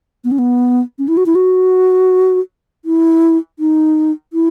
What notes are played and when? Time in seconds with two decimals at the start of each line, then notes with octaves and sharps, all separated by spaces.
0.24 B3
0.31 C#4
0.39 B3
0.99 C#4
1.08 E4
1.17 F#4
1.26 E4
1.35 F#4
2.85 E4
3.59 D#4
4.33 E4